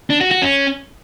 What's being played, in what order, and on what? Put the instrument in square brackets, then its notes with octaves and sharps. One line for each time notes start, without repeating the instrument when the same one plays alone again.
[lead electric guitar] D4
F#4
F#4
C#4